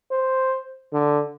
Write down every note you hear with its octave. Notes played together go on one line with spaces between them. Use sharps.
C5
D3